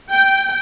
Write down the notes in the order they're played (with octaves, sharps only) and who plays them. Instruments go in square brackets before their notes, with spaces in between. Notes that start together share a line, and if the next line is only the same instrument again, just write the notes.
[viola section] G5